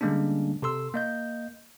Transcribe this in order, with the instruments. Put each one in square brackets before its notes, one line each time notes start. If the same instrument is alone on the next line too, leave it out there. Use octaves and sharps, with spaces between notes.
[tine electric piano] D3 G3 G#3 A#3 C#4 D4
C3 A4 C6 E6
A#3 D#5 G6